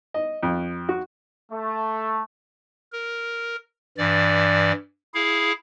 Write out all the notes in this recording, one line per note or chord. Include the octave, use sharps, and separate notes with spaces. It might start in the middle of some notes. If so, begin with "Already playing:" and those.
D#5
F2
F#4
A3
A#4
G2 E3 D5
E4 G#4 F5